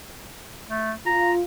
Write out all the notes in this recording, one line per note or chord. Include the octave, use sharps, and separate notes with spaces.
A3
F4 A#5